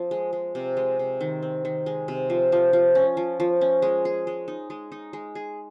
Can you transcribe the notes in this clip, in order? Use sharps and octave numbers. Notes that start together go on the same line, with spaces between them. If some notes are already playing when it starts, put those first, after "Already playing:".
Already playing: F3 C4
G#3
G#3
C3
G#3
C3
D#3
C4
D#3
G#3
C3
F3
F3
F3
C#4
F3
F3
C#4
G#3
G#4
G#3
D#4
G#3
D#4
G#3
G#4